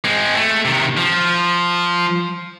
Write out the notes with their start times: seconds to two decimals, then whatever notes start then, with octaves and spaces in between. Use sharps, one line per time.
0.04 G#3 C4
0.36 A3
0.65 C3 D#3
0.97 F3